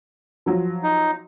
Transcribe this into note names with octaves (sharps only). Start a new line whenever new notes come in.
F3 F#3
D#4